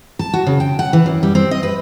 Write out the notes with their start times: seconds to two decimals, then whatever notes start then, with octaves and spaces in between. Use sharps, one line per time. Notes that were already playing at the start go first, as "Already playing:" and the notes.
0.19 A5
0.33 F#4
0.46 C#3
0.60 G5
0.79 F#5
0.93 E3
1.06 F#2
1.23 G3
1.35 C4
1.51 D#5
1.63 B4